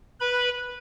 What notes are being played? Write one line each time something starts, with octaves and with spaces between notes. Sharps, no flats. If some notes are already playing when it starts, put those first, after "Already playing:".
B4 B5